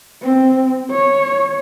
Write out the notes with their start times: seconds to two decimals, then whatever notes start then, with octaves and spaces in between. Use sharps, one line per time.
0.22 C4
0.91 C#5